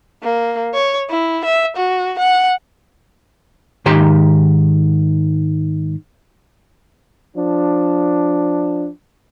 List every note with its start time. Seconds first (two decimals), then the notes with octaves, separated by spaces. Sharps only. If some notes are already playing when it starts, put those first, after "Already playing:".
0.23 A#3
0.74 C#5
1.09 E4
1.45 E5
1.77 F#4
2.19 F#5
3.86 G#2 D#3 G4 A#5 C6
7.36 F3 D4